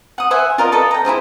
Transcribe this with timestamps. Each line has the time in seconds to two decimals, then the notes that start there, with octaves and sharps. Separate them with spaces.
0.18 F#5 D#6
0.31 C5 E5 F#5 G#5
0.58 F4 A#4 D5 D#5
0.72 A4 B4 D5 D#5
0.91 G5 A#5
1.05 E4 F4 G#4 C5